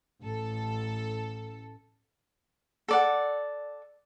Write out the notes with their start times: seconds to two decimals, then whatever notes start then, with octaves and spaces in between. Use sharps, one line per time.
0.21 A1 A4
2.88 A4 D5 F#5